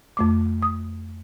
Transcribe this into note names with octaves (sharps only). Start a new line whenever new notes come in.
F2 A3 D6
D#6